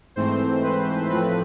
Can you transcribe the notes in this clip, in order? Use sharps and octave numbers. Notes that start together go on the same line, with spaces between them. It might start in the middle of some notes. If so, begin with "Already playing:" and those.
G#2 E3 A3 C4 C5
B4
A2 F3 A3 C4 B4